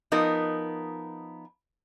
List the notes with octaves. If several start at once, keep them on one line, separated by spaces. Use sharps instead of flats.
F3 B3 D#4 A#4